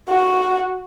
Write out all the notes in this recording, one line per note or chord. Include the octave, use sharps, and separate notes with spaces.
F#4